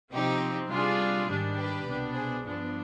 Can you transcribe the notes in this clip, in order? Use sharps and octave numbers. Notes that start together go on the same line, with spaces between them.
C3 F3 C4 D#4 G4
C3 G3 D4 F4 G#4
G#2 D#3 G3 D4
G4 B4
C2 B2 B3 D4
G#4 C5
G2 F3 B3 D4